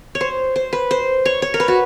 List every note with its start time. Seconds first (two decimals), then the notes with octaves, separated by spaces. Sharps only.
0.15 C#5
0.21 C5
0.56 C5
0.73 B4
0.91 C5
1.25 C#5
1.42 C#5
1.54 A#4
1.60 B4
1.68 F#4